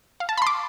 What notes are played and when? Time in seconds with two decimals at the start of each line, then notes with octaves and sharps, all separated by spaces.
0.20 F5
0.29 A5
0.37 B5
0.42 C6
0.47 D6